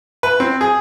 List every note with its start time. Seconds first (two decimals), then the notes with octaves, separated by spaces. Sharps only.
0.23 B4
0.40 C4
0.61 G#4